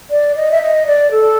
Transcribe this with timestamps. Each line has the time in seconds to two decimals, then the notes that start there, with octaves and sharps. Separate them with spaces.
0.10 D5
0.36 D#5
0.51 E5
0.62 D#5
0.87 D5
1.11 A4